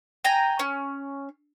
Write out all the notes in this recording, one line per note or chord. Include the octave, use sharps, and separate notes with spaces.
G5 G#5 A#5
C#4